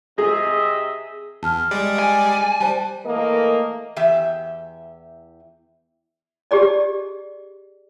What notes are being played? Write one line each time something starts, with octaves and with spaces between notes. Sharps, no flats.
C3 G#4 D#5 E5
E2 A5 F6
G3 G#3 D5
G#5
G3 C5 A5
E3 A3 A#3 A#4 D#5
E2 E3 G4 E5
G4 G#4 D5 D#5